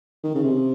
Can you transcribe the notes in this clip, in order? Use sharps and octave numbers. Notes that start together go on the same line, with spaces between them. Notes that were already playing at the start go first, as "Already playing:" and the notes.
D#3
C#3
C3